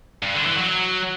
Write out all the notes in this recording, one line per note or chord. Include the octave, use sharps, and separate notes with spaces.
G2
D3
E3
F#3